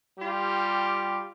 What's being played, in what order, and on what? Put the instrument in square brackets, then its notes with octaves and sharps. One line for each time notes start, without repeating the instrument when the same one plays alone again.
[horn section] G3 F4 G4